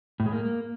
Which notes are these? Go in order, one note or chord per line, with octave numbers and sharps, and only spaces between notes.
A2
G#3
A#3